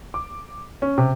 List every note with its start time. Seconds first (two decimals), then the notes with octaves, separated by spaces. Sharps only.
0.14 D6
0.82 C#4
0.98 C3